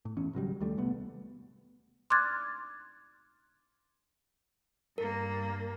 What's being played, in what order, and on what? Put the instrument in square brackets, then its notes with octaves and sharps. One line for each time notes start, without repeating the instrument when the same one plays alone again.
[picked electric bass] A2
A1 E2 C#4
G#1 C#3 F#3 G3
D#2 G3 A3
C2 A3 B3
[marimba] C6 D6 F6 F#6 G#6 A6
[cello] G2 A#3 [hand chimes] A#4